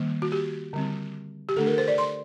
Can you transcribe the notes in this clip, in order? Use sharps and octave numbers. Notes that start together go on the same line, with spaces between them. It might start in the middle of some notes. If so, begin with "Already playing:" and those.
Already playing: D#3 G3 A#3
F#4
G4
D3 G3 C4
G4
D3 A3 D4 A4
A#4
C5
D5
C6